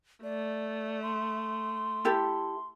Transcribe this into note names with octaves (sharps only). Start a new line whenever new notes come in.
A3 D5
C6
E4 G4 A4